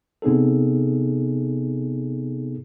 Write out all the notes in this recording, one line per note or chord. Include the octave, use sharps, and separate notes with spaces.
C3 B3 D#4 G#4 A4